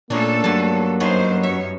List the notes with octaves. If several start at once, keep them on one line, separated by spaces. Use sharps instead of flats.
A#2 A3 A#3 C#4 D4 A4
G2 F#3 A5
F#2 B3 C#4 D#4 C5
F#2 C#5 E5